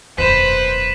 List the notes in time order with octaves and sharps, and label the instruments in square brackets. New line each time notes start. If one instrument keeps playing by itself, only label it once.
[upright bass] E1 F#2 [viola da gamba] B4 [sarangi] C5 [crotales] B6 E7 F#7